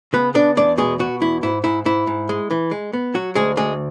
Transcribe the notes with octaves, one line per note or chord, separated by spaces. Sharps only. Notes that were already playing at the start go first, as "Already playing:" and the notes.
C#3 B3 B4
B3 D4 D5
E2 D4 D5
B2 G#3 G#4
B2 F#4
E2 E4
G#2 E4
G#2 E4
G#2 E4
G#2
G#3
E3
G#3
B3
F#3 F#4
D2 G#3 G#4
D2 G#3 G#4